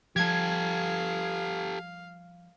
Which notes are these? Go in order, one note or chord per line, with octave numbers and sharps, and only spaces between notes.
F3 G3 G4 A4 F5 G#6